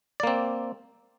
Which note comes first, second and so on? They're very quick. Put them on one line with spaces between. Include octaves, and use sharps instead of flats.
D5 A#3 C4